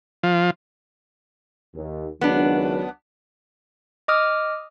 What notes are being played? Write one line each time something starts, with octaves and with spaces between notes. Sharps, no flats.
F3
D#2
C#2 D#3 F#3 B3 D4
D#5 D6 D#6 F6